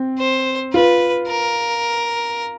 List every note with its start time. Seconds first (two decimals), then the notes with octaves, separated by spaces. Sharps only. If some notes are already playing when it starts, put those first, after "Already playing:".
Already playing: C4
0.19 C5
0.73 F4 B4
1.28 A#4